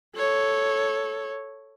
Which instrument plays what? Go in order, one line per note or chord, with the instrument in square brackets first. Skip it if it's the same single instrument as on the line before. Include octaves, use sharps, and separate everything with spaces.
[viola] A4 C#5